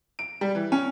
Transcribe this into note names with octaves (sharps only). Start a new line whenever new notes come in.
D7
G3
E3
C#4